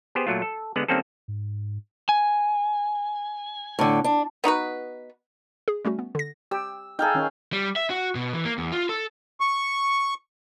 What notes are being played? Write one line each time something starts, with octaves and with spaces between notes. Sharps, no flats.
B3 G4 G#4 C5
A#2 F#3 A3 F4
A4
D3 G#3 B3 F#5
D#3 G3 A#3 C4 C#4 A4
G#2
G#5
A2 D3
D4
B3 D#4 F#4 B4
G#4
G3 A3 C#4 F#4
B3
D3 A#6
G4 E6
D#4 G#4 A4 F5 G5
D#3 C#4
G3
E5
F#4
B2
E3
A#3
E2
F4
A4
C#6